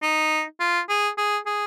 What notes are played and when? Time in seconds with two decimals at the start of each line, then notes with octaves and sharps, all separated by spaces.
0.03 D#4
0.60 F4
0.89 G#4
1.18 G#4
1.46 G#4